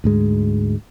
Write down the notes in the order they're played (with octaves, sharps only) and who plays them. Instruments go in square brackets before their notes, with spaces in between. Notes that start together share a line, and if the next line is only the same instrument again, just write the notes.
[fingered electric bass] D2 G#2 G#3